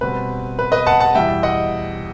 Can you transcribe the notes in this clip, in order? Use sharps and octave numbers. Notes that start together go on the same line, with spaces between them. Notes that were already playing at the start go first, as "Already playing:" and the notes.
B2 G3 C4 B4
B4
B4 D#5
F#5 A5
F#5 A5
E2 B2 G3 E5 G5
D#5 F#5